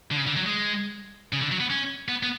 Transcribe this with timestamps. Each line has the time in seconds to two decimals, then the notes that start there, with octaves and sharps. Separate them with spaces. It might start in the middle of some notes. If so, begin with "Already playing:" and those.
0.11 D3
0.17 C#3
0.27 D3
0.36 F#3
0.46 G#3
1.33 C#3
1.42 D3
1.52 F#3
1.60 B3
1.70 C#4
2.08 B3
2.23 B3